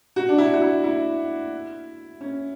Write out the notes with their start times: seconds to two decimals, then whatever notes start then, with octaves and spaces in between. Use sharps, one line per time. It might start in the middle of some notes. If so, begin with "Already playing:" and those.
0.16 F#4
0.29 D4
0.38 E4
0.53 F#4
0.62 E4
0.84 E4
2.21 C#4